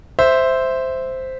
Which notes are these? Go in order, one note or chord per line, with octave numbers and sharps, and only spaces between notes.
C5 E5